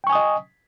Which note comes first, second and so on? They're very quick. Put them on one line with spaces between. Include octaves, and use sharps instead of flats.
G5 C#6 G#5 D#6 D#5